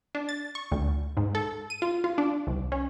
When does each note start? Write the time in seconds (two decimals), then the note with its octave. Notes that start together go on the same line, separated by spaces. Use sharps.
0.15 D4
0.29 A6
0.55 C#6
0.72 D2
1.17 G#2
1.35 A4
1.70 D#7
1.82 F4
2.04 F4
2.18 D4
2.47 C2
2.72 C#4